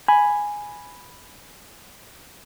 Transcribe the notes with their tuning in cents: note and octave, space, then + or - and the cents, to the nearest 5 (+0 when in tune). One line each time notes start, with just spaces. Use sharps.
G#5 +0 B5 +0